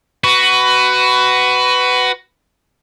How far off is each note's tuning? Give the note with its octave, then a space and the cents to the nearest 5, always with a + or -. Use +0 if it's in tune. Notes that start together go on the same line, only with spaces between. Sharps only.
F#4 +15 B4 +15